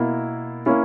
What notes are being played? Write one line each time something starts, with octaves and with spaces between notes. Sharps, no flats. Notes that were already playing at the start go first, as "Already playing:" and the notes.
Already playing: B2 A#3 E4 A#4
A#3 C#4 E4